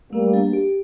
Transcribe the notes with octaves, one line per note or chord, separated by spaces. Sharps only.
G3 A3 A#3
D4
G4